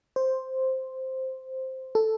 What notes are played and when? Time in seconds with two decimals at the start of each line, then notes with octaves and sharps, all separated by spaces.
0.16 C5
1.95 A4